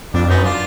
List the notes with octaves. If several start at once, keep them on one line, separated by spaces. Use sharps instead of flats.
F2 D4
F#2 B3 D#4
D4 F4